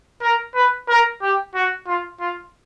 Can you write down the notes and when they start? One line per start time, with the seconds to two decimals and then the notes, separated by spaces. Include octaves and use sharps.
0.22 A#4
0.55 B4
0.89 A#4
1.22 G4
1.55 F#4
1.87 F4
2.20 F4